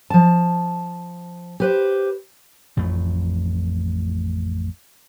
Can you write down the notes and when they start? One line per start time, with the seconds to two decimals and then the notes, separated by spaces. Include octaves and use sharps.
0.10 F3 A5
1.60 G4 B4 C5
2.77 A1 F2 A3